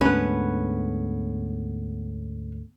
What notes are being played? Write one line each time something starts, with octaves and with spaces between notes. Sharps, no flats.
D2 G#2 B3 C#4 B4